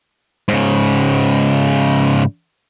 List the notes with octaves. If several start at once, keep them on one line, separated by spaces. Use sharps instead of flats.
G#2 C#3